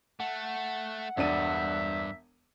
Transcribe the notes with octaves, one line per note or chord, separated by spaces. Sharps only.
A3 F#5
E1 G2 D4 E5 D#7